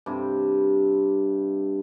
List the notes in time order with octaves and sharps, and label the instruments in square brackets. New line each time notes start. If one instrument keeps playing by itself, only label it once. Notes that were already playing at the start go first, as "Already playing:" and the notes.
[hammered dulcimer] G2 C3